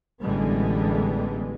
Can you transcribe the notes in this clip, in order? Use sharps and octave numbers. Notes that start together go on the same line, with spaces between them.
A1 D3 E3 G3 G#3 B3